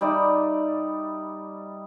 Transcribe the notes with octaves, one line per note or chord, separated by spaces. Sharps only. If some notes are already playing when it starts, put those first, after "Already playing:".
G3 D#4 D5 E5